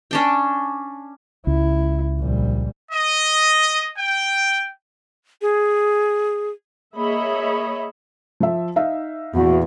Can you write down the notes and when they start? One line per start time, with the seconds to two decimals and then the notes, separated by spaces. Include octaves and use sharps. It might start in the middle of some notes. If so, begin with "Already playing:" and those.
0.11 C#4 D4 G5
1.47 C#2 E4
2.19 A#1 G3
2.90 D#5
3.96 G5
5.42 G#4
6.96 A#3 G#4 C#5 D#5 E5 B5
8.40 F3 E5
8.76 D#4 E5 F5
9.35 E2 A#2 F#4